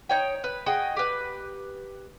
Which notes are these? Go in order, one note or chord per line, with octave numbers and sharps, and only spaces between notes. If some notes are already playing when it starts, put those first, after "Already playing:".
D#4 C#5 G5
B4
F#4 G#4 D#5 G5
G4 B4